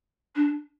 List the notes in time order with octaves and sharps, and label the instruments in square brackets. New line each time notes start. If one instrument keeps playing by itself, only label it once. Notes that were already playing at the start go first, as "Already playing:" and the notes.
[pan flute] D4